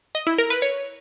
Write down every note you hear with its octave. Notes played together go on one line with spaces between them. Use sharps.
D#5
E4
A#4
B4
C#5